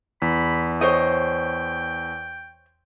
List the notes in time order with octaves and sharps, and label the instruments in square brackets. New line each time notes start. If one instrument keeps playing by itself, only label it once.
[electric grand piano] E2 [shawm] B5
[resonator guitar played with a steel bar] C5 C#5 D#5 [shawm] G5